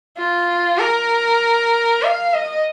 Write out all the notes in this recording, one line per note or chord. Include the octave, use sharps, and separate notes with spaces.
F4
A#4
F5
D#5